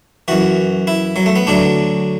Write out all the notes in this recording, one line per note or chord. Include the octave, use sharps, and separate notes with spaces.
F#2 E3 F#4
E4
F#3
A3
B3
D2 D3 F#3 D4